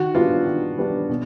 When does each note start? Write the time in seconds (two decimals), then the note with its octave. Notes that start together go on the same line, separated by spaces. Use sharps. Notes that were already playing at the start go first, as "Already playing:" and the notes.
Already playing: D#3 F#4
0.15 G3 B3 D4 F4
0.46 D#3
0.78 G3 B3 D4
1.09 B2